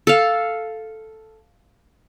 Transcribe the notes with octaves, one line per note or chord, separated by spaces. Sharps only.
A4 F5